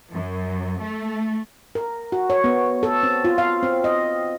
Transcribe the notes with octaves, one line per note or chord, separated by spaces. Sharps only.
F#2
A3
A#4
F#4
C#5
B3
A4
C4
F4
F5
C4
D#5